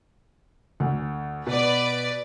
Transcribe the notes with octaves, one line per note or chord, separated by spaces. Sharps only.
D2
B2 B4 D5